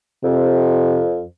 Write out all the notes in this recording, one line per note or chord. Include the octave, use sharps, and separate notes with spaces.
F2 C3